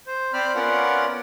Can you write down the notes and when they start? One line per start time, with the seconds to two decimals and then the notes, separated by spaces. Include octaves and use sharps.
0.07 C5
0.33 C4 C5 D5 B5 F6
0.55 B3 C#4 F4 A#4 D5 F#5